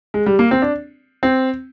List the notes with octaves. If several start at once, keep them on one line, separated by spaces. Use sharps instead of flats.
G#3
G3
A#3
C4
D4
C4